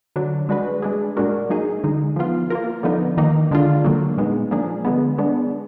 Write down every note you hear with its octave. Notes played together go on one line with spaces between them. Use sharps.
D3 F#3 D4
G#3 D4 F#4 B4
G#3 D4 G#4
A#2 G#3 D4 F#4 A#4
F#3 A#3 D#4 G#4
D3 G#3 D#4
F3 B3 F4
A#3 F4 A#4
D3 F3 B3 D#4
D#3 A#3 D#4
D3 G#3 D4 F4
D3 F#3 A#3
A#2 G#3 B3 D#4
F3 A#3 D4 G#4
D3 G#3 B3
G#3 B3 D4